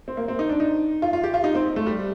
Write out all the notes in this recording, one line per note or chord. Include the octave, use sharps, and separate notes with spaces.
C4
A#3
C4
D#4
D4
D#4
F4
F4
G4
F4
D#4
C4
A3
G3